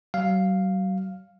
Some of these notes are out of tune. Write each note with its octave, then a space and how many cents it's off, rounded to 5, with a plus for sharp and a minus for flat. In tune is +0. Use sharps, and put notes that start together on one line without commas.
F#3 +45 F5 +0